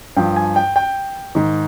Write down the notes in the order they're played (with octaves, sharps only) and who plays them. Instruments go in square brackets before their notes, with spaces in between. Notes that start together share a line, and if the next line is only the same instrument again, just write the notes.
[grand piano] G2 F3 G5
G#5
G5
G5
G#2 D#3